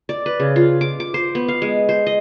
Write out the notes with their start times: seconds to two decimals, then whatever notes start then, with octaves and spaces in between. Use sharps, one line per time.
0.09 D5
0.26 B4
0.40 C#3
0.56 F4
0.81 D6
1.00 D6
1.14 C5
1.35 B3
1.48 F5
1.62 G#3
1.89 C5
2.07 D#5